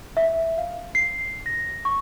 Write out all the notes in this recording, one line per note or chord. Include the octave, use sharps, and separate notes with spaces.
E5
F5
C7
A#6
C#6